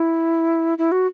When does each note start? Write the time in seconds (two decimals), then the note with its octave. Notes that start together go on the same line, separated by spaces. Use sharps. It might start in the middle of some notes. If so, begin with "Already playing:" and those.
Already playing: E4
0.78 E4
0.92 F#4